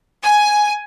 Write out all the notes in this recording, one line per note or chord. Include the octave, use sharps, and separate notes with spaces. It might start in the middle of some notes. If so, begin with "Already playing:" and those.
G#5